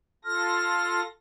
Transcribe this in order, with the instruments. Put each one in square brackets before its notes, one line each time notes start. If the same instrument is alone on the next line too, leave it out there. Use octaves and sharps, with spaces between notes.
[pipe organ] F4 A4 A#6 [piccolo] F6